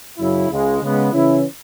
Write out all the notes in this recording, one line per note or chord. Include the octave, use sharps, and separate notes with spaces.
F#2 C#3 F#3 E4
C#2 C#3 G#3
C#3 G#3 B3
C#3 E3 C#4 E4